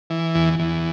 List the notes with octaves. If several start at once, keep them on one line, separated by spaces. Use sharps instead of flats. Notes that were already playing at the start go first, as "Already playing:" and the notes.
E3
E2
E2